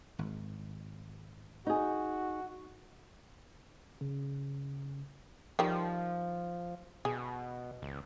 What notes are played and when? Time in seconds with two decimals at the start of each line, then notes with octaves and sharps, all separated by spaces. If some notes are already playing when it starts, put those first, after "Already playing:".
0.19 G#1
1.67 D#4 F#4 G#4
4.01 C#3
5.59 D#3 F3 G3
7.05 B2 G#4
7.82 C#2